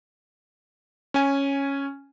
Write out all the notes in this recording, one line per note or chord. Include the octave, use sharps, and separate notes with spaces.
C#4 G#5